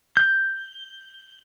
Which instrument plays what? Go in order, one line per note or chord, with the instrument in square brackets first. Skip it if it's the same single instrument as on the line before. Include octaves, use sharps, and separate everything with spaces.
[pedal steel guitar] G6